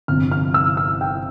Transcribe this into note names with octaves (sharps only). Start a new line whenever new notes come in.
G1 F2 C3 F6
F6
E6
E6
G5